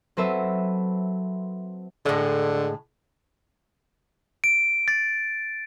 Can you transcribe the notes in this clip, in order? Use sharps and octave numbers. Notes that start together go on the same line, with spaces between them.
F#3 C4 A4 B4 C5 E5
A2 D3 G#3
D7
A6